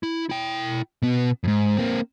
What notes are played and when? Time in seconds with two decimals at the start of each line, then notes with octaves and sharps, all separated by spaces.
0.03 E4
0.29 E4 G5
1.02 B2 B3
1.44 F2 G#2
1.77 A#3 C4